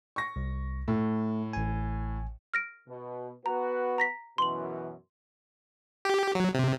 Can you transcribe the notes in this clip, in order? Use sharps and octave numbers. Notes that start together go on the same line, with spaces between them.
C#6 A#6
C2
A2 A3
A1 G#5
F6 A#6 D7
B2
B3 F#4 B4 A#5
A#5 A#6 B6
F#2 B2 E3 C6 F#7
G4
F#3
C3